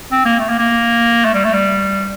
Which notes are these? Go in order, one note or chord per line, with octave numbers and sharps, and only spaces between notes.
C4
A#3
A3
A#3
A#3
A3
G3
A3
G3